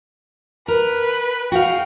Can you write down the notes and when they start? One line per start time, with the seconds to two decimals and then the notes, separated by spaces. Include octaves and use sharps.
0.68 A#4 B4
1.52 F#4 G#4 F5 G5